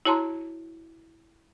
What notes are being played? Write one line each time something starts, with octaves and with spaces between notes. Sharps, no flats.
E4 F#4 C#5 A5 A#5 C6